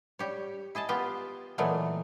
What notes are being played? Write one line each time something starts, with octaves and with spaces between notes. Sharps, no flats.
G3 G4 C#5
E4 G#4 D#5 A5
B3 F4 G4 B4 G5
A#2 E3 F#3 G#3 A3 B3